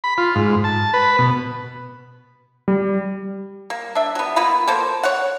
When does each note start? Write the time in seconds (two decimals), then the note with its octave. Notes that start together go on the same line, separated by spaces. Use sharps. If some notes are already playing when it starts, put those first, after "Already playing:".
0.04 B5
0.18 F4
0.36 G#2
0.64 A5
0.93 B4
1.19 B2
2.68 G3
3.70 A#3
3.95 D4 E5
4.15 F#3 B3
4.36 A#3 B3 F4 B5
4.67 A#3 A4 C5
5.03 C#5 F#5